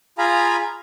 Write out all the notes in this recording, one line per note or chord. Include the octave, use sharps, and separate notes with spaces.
F4 G#4 F5 G#5 A#5 B5